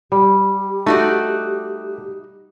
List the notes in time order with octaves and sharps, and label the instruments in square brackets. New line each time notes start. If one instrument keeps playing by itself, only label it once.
[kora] G3 [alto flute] G4
[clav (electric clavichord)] A3 [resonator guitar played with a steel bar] D#4 F#4 D5